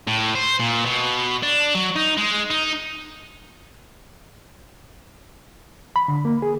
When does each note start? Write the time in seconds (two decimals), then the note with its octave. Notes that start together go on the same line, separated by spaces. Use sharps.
0.08 A2
0.35 C5
0.60 A#2
0.85 B2
1.43 D4
1.75 F#3
1.96 D#4
2.17 G#3
2.51 D#4
5.96 B5
6.08 D3
6.25 A#3
6.42 G#4